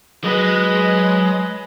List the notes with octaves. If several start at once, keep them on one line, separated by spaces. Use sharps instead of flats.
F#3 G#3 B4 D#5